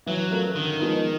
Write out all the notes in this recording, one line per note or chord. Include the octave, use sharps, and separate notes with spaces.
E3 F#3
A3 C#4 F4 A#4
D3 D#3
F3 G#3 B3 D#4